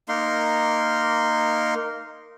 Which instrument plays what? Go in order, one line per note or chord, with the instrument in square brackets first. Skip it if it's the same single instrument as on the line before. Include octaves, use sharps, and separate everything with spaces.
[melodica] A#3 D#4 A#4 C6